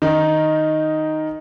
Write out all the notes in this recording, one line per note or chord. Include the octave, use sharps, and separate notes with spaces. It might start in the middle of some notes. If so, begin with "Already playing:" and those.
D#3 D#4